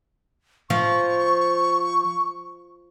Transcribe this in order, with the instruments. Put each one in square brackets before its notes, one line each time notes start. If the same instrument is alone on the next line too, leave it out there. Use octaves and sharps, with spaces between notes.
[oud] F3 [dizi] C#6